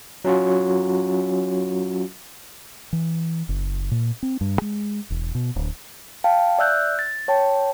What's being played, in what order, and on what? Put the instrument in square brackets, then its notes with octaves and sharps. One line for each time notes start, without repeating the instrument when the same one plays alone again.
[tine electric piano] F#3 C#4 F4 F#4
[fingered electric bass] E3
F#1
A#2
C4
G2
G#3
E1
B2
D1
[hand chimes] F5 G5 A5
D5 E5 E6 F#6 G6
A6
C#5 G5 A5